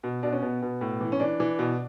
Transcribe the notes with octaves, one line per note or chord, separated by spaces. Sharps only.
B2
B2 D4
C#4
B2 B3
B2
A2
E3
C#4
E3 D4
E3
B2